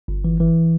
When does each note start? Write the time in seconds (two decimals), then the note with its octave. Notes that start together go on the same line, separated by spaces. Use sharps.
0.08 G1
0.24 E3
0.40 E3